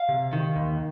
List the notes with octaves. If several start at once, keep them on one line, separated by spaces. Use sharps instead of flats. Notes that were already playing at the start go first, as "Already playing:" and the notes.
Already playing: F5
C3
D#3
D#2